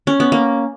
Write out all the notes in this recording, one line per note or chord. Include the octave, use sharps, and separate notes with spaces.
C#4
B3
A#3